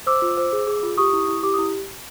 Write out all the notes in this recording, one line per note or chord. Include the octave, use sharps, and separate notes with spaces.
C5 D6 E6
F4
C5
G#4
G#4
F4
G4 C#6 D#6
E4
E4
G4 D6
E4 D#6